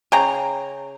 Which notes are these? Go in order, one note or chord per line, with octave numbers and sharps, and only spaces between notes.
C#3 G5 A#5